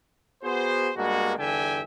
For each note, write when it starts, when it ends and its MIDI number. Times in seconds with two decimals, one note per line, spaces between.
0.43 0.91 59
0.43 0.91 66
0.43 0.91 68
0.43 0.91 72
0.96 1.34 43
0.96 1.34 56
0.96 1.34 58
0.96 1.34 59
0.96 1.34 66
1.39 1.82 31
1.39 1.82 40
1.39 1.82 50
1.39 1.82 76
1.39 1.82 79
1.39 1.82 80